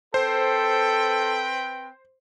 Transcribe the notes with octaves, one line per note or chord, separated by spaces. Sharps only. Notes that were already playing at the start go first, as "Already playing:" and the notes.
C4 A4 B4 C5 G5